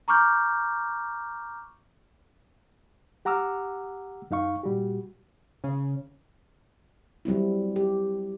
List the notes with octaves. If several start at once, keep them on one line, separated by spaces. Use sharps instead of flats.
A#5 C#6 D6 F6 G6
G4 F#5 A#5 D6 E6 F6
F#2 D#4 F5 C#6
A#2 G3 F#4 G4
C#3
F#3 G3 C4 E4
G4